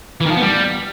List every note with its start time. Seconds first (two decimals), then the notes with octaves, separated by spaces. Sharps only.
0.21 E3
0.26 D#3
0.31 F3
0.36 B3
0.41 G3